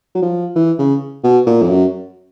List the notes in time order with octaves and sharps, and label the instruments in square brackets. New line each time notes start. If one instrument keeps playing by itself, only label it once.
[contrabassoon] F#3
F3
E3
C#3
B2
A#2
F2
F#2